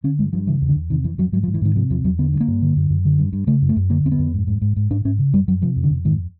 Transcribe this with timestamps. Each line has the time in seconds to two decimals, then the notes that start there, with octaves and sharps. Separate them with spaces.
0.04 D3 C#4
0.19 G2 G#3
0.33 G2 F3
0.47 C#3 E3
0.62 E2
0.69 D3
0.76 E2
0.90 C3 D#3
1.04 F2 E3
1.18 F2 F#3
1.32 G#2 F#3
1.43 F3
1.47 G#2
1.54 E3
1.62 G#2 D#3
1.76 C3 F3
1.90 E2 F3
2.04 E2 F#3
2.19 D3 B3
2.33 G2
2.40 A#3
2.48 G2
2.62 D3
2.76 F#2
2.90 F#2
3.05 D3
3.19 G2
3.33 G2
3.47 C#3 A3
3.62 F#2
3.69 A3
3.76 F#2
3.90 D3 A#3
4.05 F2 C4
4.11 B3
4.19 F2
4.34 G#2
4.47 G#2
4.62 G#2
4.76 G#2
4.90 G#2 D4
5.05 G#2 C#4
5.19 C#3
5.33 F#2 G3
5.48 F#2 F#3
5.62 C3 F3
5.76 F2
5.83 D3
5.91 F2
6.05 G#2 D#3